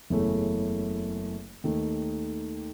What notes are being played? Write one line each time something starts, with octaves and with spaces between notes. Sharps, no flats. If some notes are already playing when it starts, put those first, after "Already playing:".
F#1 E2 C#3 E3 A3
D#2 D#3 A3 D#4